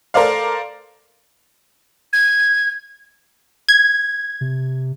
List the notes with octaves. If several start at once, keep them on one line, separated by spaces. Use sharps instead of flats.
A4 A#4 C5 D5 F5
G#6
G#6
C3